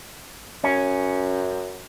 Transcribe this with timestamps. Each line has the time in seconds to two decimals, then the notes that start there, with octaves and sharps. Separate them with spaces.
0.64 F#2 C#4